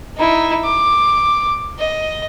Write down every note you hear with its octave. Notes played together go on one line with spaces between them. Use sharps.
D#4 E4
D6
D#5